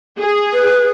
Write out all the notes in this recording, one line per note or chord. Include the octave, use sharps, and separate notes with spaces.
G#4
B4